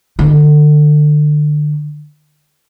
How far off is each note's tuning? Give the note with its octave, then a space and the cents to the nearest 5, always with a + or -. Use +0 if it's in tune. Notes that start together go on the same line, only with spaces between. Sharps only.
D3 +30 D#4 -35